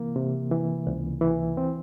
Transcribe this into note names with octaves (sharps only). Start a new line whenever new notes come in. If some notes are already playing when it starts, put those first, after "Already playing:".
Already playing: C3 E3 A#3
C3
E3
C#2
E3
C4